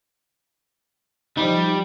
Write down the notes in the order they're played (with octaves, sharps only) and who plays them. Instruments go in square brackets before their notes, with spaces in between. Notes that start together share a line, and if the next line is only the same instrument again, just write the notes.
[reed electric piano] F3 D#4 [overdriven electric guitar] G3